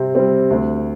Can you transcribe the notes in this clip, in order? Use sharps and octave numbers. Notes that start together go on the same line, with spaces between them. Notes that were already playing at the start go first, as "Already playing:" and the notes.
Already playing: C3 G3 C4
G3 C4
D2